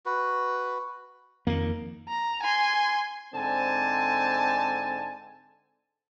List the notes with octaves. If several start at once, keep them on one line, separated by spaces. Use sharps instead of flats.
F#4 B4
F2 D#3 A#3
A#5
G#5 C6
G#2 D3 C4 G#5 A5